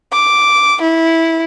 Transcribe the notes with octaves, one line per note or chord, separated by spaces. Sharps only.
D6
E4